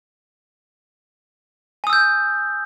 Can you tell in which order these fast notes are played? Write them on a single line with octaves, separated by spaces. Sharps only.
G#5 D#6 E6 G6